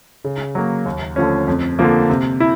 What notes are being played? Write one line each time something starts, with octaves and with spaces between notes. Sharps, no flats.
C#3
F#3 A#3
D#2
D3 F3 A3 C#4
F2
D3 F3 A#3
C3
E4